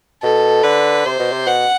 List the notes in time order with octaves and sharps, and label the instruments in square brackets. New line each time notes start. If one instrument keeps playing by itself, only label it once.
[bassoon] B2 [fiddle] A4
[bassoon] D3 [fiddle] B4
[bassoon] C3 [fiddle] C5
[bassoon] B2
C3
[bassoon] B2 [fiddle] F#5